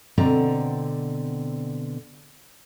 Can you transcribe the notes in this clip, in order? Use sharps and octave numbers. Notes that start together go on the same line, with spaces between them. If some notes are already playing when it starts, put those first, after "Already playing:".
B2 D3 C4 D5 F#5 A#5